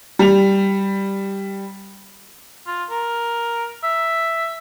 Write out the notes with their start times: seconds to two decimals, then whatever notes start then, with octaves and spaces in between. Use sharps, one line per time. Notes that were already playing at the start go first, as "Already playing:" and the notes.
0.19 G3 F7
2.67 F4
2.90 A#4
3.84 E5